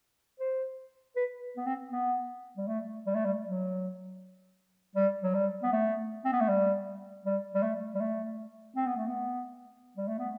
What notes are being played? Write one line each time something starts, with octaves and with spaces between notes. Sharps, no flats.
C5
B4
B3
C4
B3
G3
A3
G3
A3
G3
F#3
G3
F#3
G3
B3
A3
C4
B3
A3
G3
G3
G3
A3
G3
A3
C4
B3
A3
B3
G3
A3
B3